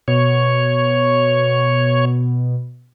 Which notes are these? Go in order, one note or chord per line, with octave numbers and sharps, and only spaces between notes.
B2 C#5